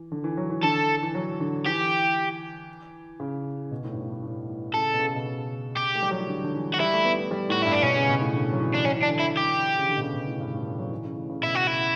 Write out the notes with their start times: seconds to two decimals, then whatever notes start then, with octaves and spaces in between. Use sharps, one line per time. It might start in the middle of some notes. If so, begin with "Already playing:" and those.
Already playing: E3
0.12 D3
0.24 E3
0.37 F#3
0.50 E3
0.63 D3 A4
1.03 E3
1.15 F#3
1.40 D3
1.66 E3 G4
3.20 C#3
3.71 B2
3.84 A2
3.92 G2
3.97 A2
4.10 G2
4.23 A2
4.49 A2
4.74 C#3 A4
4.93 B2
5.00 C#3
5.15 B2
5.26 C#3
5.77 G4
5.95 A3
6.02 G3
6.11 F#3
6.19 E3
6.28 D3
6.44 D3
6.55 E3
6.74 F#4
6.80 G3 E4
6.93 A3
7.05 B3
7.18 B3
7.31 G3
7.49 A2 F#4
7.62 G2 E4
7.73 D4
7.83 B2 C#4
7.96 C#3
8.09 B2
8.21 A2
8.34 D3
8.52 F#3
8.59 E3
8.75 D4
8.85 F#3 C#4
8.96 E3
9.03 D4
9.09 D3
9.20 E3 E4
9.37 G4
9.78 C#3
9.89 D3
9.97 B2
10.01 C#3
10.14 B2
10.27 A2
10.40 G2
10.53 A2
10.65 A2
10.79 F#3
10.91 E3
11.05 C#3
11.16 A2
11.30 C#3
11.43 B2 E4
11.55 F#4
11.67 E4